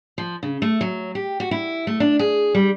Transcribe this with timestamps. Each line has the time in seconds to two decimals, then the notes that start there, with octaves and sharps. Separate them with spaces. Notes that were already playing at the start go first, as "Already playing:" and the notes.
0.18 F3
0.43 C#3
0.62 A3
0.81 F#3
1.15 G4
1.40 F#4
1.51 E4
1.87 A3
2.00 D4
2.19 G#4
2.55 G3